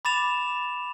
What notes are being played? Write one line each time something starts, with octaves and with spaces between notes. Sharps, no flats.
B5 D6 A6 E7 F7